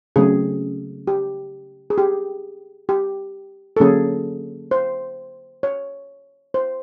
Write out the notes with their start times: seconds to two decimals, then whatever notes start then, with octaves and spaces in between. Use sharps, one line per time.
0.16 C#3 F#3 A3 C4 G#4
1.07 G4
1.90 G#4
1.98 G4
2.89 G4
3.77 A4
3.80 D3 F#3 A#3 C#4 G#4
4.71 C5
5.63 C#5
6.54 C5